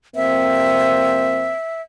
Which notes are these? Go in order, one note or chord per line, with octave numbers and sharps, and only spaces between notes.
F2 A#3 C4 E5